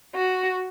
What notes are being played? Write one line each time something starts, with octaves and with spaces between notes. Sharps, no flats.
F#4